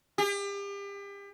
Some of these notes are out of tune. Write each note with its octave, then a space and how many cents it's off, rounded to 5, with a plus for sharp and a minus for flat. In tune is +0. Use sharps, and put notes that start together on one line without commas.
G4 +35